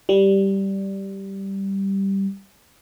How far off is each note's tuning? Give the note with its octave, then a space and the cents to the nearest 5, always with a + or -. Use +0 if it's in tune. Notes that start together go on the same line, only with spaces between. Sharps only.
G3 -5